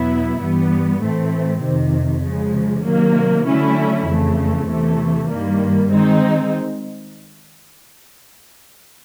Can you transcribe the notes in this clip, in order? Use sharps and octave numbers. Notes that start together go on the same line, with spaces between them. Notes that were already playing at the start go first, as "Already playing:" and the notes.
Already playing: E2 B2 F#3 B3 E4
G2 E3 G3 B3
A2 E3 A3 C4
F2 C3 D#3
C#3 F3 G#3
C3 D#3 F#3 A#3
D3 F#3 A3 C#4 E4
F2 C#3 E3 A3
E2 C3 E3 A3
G2 D#3 G3 A#3
D#3 G#3 C4 D#4